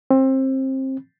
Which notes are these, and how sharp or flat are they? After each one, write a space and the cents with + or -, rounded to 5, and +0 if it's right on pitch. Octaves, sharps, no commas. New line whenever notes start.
C4 +25